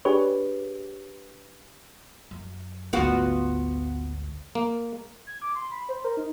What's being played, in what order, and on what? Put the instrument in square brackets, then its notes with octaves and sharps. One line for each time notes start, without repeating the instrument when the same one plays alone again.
[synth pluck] D4 G4 G#4 B4 C#5
[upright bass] F#2
[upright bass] G#1 D2 [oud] B3 F4 F#4
[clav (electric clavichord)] A#3
[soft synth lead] G#6
D6
C6
B5
C5
A#4
D#4